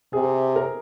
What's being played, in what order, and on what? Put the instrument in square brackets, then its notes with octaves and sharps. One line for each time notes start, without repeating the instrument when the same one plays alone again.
[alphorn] C3 [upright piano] G#4
[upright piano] A#4